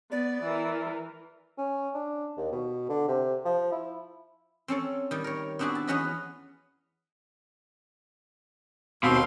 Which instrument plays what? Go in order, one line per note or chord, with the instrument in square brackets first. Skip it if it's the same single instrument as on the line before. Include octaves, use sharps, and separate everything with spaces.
[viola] B3 [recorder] D5
[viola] E3 A#4
[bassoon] C#4
D4
D#2
B2
D3
C3
F3
E4
[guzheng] C4 C#4 A4 C#5
D#3 G3
A#4 C#5
B3 C4 D4 E4 F#4 G#4
A5
E2 B3 C#4 F#4 D#5 B5
[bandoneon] D#2 F5 C6 [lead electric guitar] B2 C4